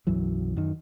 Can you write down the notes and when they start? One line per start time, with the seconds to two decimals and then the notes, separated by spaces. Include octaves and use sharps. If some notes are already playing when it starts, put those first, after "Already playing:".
0.07 B1 F#2 E3 F#3
0.56 F#2 D#3